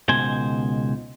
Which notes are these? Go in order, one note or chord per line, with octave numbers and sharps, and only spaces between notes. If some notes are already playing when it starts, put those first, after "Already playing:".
C#2 B2 D#3 C5 G#5